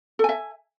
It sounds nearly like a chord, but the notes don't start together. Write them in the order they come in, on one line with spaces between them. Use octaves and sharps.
A4 G#5 E5